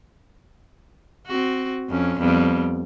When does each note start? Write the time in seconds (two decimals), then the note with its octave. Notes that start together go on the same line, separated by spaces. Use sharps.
1.27 C4 F#4
1.89 F2 C#4
2.20 F2 G3 B3